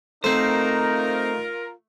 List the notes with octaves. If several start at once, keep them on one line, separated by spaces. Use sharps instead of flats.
A3 C4 D#4 F4 A#4 C5